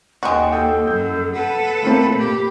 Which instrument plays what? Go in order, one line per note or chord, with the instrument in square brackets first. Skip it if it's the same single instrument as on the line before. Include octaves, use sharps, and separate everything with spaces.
[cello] D#2 [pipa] G#3 F#4 [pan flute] G5
[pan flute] A4 [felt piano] G5 D#6
[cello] F#2 F#3 [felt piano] G6
[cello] A4 B4 [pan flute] F#5
[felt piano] A3 A#3 C4 [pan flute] B5
[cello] A#2 G4